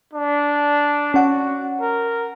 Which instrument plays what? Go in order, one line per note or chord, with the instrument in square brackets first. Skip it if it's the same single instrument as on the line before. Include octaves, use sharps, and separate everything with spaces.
[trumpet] D4
[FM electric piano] C#4 F#5 [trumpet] F#4
[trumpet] A#4